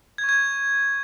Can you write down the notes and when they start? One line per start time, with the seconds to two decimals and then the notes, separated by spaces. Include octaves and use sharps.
0.18 G#6
0.24 C#6
0.29 G#6